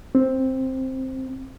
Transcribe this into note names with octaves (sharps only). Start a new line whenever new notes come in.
C4